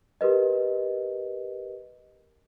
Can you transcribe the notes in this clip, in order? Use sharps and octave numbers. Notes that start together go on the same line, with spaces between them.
G4 A#4 B4 D#5